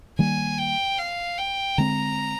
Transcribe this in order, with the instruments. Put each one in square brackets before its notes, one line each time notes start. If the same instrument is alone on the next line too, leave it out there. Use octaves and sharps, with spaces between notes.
[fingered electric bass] D#3 G3 A#3 [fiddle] G#5
[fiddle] G5
F5
G5
[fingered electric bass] D3 G#3 C4 [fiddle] A#5